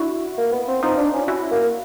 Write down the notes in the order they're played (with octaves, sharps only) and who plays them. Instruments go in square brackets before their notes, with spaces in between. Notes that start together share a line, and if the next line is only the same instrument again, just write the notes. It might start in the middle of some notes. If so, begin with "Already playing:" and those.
Already playing: [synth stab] D4 E4 F#4
[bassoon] A#3
B3
C4
[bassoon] C4 [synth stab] D#4 F4
[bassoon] D4
C#4
[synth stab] E4 F#4
[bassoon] A#3